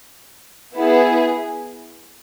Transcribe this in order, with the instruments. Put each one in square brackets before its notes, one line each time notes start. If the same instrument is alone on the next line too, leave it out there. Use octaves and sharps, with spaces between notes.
[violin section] B3 E4 G#4